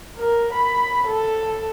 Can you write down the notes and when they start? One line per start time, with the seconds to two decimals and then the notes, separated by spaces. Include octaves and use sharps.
0.18 A#4
0.54 B5
1.08 A4